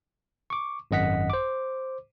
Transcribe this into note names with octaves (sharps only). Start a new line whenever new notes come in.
C#6 D6
G#1 F#2 D#5 F#5 B6
C5 D6